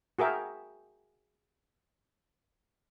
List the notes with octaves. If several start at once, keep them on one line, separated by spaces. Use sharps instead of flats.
F#4 G#4 A#4 E5 G5